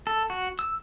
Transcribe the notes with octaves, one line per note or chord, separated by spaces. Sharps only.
A4
F#4
E6